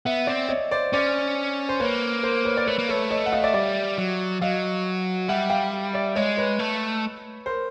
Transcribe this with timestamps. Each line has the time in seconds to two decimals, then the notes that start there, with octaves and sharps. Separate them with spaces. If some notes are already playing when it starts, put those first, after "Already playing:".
0.05 B3 E5 F#5
0.27 C4 D5 E5
0.49 C#5 D#5
0.71 C5 D5
0.93 C#4 C5 D5
1.69 C5
1.80 A#3 B4 C#5
2.23 A#4 C5
2.45 B4 C#5
2.57 D5
2.67 A3 B4 C#5
2.79 A#3
2.89 A3 B4 C#5
3.11 C#5 D#5
3.26 F#5
3.33 D#5 F5
3.44 D5 E5
3.54 G3 D5 E5
3.98 F#3
4.42 F#3 D#5 F5
5.28 G3 E5 F#5
5.50 F5 G5
5.94 D5 E5
6.15 G#3 C#5 D#5
6.37 B4 C#5
6.59 A3
7.46 A#4 C5